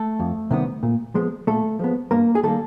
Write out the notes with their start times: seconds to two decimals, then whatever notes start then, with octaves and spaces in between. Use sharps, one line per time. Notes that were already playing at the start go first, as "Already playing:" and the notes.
Already playing: A3 A4
0.19 F2
0.51 C3 D#3 G3 B3
0.83 A#2
1.15 F3 G#3 B3
1.47 A#2 A3 A4
1.79 F3 G#3 B3
2.11 G2 A#3 A#4
2.35 G#4
2.43 D#3 G3 A3 A#3 A4